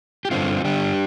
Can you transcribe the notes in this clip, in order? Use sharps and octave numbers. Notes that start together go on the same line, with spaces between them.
G4
G2 D3 C4 F4
G2 D3 D4 G4